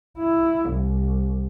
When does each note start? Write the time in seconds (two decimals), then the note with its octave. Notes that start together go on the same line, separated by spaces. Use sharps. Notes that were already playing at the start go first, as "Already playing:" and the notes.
0.18 E4
0.70 C2